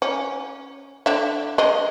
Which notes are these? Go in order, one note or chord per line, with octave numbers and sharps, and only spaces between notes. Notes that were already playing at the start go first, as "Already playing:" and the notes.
C#4
D3 E5
G#3 D#5